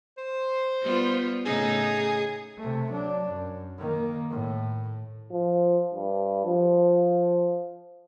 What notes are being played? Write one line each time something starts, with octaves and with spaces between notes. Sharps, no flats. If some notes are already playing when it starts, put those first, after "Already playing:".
C5
G3 B3 F4
A2 C#3 D#4 G#4
C3 A3
F#3 D4
F#2
D#3 A#3
A2
F3
G2
F3